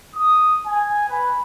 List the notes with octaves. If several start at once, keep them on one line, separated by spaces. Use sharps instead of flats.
D#6
G#5
B4